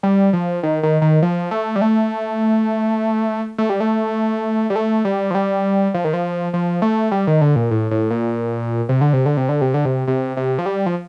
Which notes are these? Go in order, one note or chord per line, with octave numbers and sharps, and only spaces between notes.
G3
F3
D#3
D#3
D#3
F3
A3
G3
A3
A3
G3
A3
G3
A3
G3
F3
G3
F3
D#3
F3
F3
A3
G3
D#3
D3
A#2
A2
A2
A#2
C3
D3
C3
D3
C3
D3
C3
D3
C3
C3
C3
F3
G3
F3